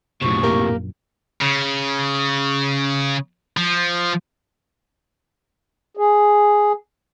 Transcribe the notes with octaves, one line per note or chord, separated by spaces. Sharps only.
A#1 F#2 A2 C3 C#6
A#3 G4 A#4
C#3
F3
G#4